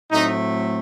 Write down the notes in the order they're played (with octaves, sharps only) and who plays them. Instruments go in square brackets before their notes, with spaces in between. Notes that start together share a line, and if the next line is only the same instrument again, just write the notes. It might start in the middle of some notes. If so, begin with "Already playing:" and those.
[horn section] A2 F#3 A3 C4 D#4